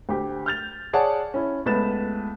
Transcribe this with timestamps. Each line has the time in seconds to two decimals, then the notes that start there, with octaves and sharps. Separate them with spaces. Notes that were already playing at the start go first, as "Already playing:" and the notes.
0.09 D2 G4 C5
0.46 F6 G6 A6 F7
0.93 G#4 C#5 D5 F#5 A5
1.34 C#4 E4
1.66 C#2 A3 B3 B4 A6 E7